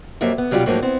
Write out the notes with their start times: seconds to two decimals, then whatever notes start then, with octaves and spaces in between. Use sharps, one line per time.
0.21 F2 F#3 A#3 G4 E5
0.38 B3
0.51 B2 F#3 G3 E4 F4 G4
0.66 G#2 F3 F#3 A3 A#3 D#4
0.82 B3 C4 E4